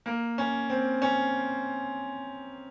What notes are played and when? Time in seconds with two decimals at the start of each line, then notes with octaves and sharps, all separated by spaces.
0.06 A#3
0.38 C#4
0.70 C4
1.02 C#4